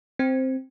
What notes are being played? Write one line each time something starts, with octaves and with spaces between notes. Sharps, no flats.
C4